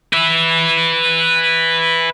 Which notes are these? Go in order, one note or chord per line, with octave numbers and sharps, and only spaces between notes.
B4 E5